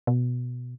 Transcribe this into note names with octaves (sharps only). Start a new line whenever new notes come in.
B2